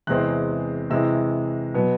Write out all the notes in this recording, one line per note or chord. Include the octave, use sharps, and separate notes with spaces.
E2 C3 E3 G#3 C4 F#6
C3 E3 G#3 E6
B2 F#3 B3